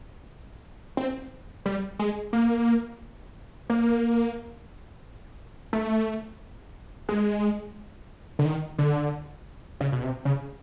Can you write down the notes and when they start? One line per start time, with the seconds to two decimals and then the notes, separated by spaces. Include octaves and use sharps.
0.97 C4
1.66 G3
1.99 G#3
2.33 A#3
3.70 A#3
5.73 A3
7.09 G#3
8.39 D3
8.45 D#3
8.78 D3
9.80 C#3
9.92 B2
10.03 C3
10.25 C#3